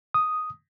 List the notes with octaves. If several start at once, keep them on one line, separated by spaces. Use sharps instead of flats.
D#6